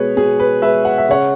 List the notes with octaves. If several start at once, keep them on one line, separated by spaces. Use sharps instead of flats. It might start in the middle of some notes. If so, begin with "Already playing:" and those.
Already playing: B2 G#3 G#4 B4 C#5
B2 G#4
B4
G#3 B4 E5
F#5
E5
C#3 C#5 F#5